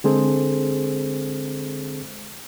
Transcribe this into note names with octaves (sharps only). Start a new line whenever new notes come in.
D3 G#3 C4 G#4 A4 C5